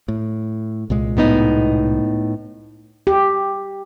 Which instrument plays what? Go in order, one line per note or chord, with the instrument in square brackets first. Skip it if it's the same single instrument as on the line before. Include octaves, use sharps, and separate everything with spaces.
[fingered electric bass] A2
C2 A#2 G#3
[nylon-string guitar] A2 B3 D#4
[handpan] G4